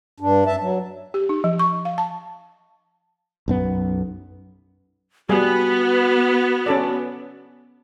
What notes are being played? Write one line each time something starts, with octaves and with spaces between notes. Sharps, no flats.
G2 D4
F#2 E5 A5
F#3
G4
D#4
F3
C#6
F5
A5
B1 F#2 B3
G3 B3 F#4 G#4
C#4 A4 D5